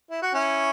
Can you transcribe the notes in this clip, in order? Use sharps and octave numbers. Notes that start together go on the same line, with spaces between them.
E4
F#4
C#4 E4